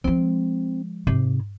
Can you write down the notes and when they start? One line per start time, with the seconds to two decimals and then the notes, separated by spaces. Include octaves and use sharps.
0.04 F3 G#3 C4
1.07 G#2 C3